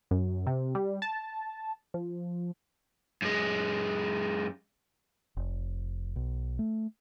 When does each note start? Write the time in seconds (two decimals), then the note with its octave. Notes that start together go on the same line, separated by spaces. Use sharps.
0.11 F#2
0.47 C3
0.75 G3
1.02 A5
1.94 F3
3.22 F#2 G#3
5.37 F1
6.16 B1
6.59 A3